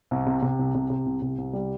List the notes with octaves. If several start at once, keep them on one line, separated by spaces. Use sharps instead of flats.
C2
C3
C3
C2
C3
C3
C2
C3
C2
G3